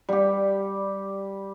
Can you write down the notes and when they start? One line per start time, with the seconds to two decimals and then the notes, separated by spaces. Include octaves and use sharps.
0.09 G3 G4